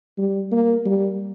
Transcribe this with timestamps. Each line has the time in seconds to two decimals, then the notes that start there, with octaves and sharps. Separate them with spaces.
0.18 G3
0.52 A#3
0.86 G3